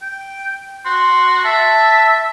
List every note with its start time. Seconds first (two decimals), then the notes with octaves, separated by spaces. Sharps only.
0.02 G5
0.85 F#4 C6
1.45 E5 A5